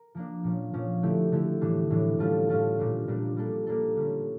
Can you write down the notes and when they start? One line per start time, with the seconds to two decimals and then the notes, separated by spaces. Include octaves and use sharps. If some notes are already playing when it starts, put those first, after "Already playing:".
Already playing: A#4
0.15 F3 A#3 D4
0.44 A#2 F3 C#4
0.73 A#2 F3 C#4
1.03 D3 A3 E4 G4
1.32 D3 A3 E4 G4
1.61 A2 E3 G3 D4
1.90 A2 E3 G3 D4
2.18 A2 G3 C#4 F4 A4
2.49 A2 G3 C#4 F4 A4
2.78 A#2 G3 D4
3.08 A#2 G3 D4
3.37 G3 A#3 D4 A4
3.67 G3 A#3 D4 A4
3.96 D3 G3 C#4